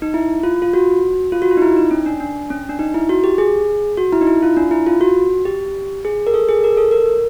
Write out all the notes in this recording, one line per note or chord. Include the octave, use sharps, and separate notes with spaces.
D#4
E4
F4
F4
F#4
F4
F#4
F4
D#4
E4
D#4
C#4
D4
D4
C#4
D4
D#4
E4
F#4
G4
G#4
F#4
E4
D#4
E4
F4
D4
E4
F4
F#4
G4
G#4
A#4
A4
G#4
A#4
A4
A#4